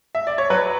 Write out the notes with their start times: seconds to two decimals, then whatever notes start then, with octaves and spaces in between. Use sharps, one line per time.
0.15 E5
0.27 D5
0.38 C#5
0.50 F#3 B4